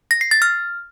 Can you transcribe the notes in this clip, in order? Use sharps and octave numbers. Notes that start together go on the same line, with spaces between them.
A#6
C7
A6
F6